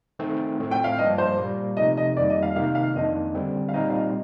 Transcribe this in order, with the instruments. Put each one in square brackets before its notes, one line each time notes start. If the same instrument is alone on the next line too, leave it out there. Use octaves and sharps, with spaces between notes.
[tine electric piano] D#3 A3 C4
A2 A3 C4
[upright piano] G5
F5
[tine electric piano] G2 F3 A#3 D4 [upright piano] D#5
[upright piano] C5
[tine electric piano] A#2 G3 A#3
[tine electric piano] C3 F3 A3 D#4 [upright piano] D#5
[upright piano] D#5
[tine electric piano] F2 D#3 G3 A#3 [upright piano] D5
[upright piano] D#5
F5
[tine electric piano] C3 D#3 A#3 D#4 G4 [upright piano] F5
[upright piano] F5
[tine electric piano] F2 D#3 A#3 D4 [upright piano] D#5
[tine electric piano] D3 G3 C4
[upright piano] F5
[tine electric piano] A#2 G3 C4 D#4 [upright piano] D#5
[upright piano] F5
D#5